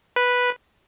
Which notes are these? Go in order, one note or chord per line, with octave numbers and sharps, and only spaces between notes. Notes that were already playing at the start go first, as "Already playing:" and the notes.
B4